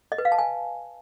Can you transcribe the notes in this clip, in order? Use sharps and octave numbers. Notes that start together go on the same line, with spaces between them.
D#5
B4
F5
A5
G#5